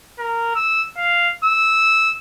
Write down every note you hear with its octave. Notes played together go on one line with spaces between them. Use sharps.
A#4
E6
F5
E6